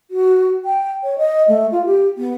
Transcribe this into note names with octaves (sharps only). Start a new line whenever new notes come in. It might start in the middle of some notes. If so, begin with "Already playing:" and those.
F#4
G5
C#5
D#5
A3
F4
G4
B3